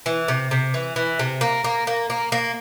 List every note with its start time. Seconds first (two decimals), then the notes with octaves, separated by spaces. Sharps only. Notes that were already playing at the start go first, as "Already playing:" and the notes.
0.06 E3
0.28 C3
0.51 C3
0.74 E3
0.96 E3
1.19 C3
1.41 A#3
1.64 A#3
1.87 A#3
2.10 A#3
2.32 A#3